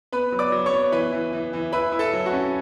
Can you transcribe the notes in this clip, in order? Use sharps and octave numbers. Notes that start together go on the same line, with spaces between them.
B3 B4 B5
F#3
D5 D6
F#3
C#5 C#6
B3
E3 B4 B5
E3
E3
E3
E4 B4 B5
E4
A4 A5
F#3
F#4 F#5
C#4